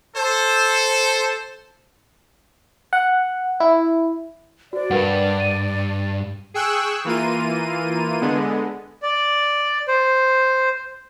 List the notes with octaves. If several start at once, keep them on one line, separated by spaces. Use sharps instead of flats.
A4 C5
F#5
E4
F#4 C5 D5
G2 A#4 B4 F#5
D#7
G#4 G5 C#6 E6 F#6
E3 A#3 F4 D#7
D3 G#3 B3
D5
C5